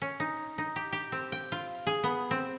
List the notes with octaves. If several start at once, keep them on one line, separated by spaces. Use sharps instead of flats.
C#4
D#4
D#4
G4
G4
C4
G5
F4
G#4
B3
C4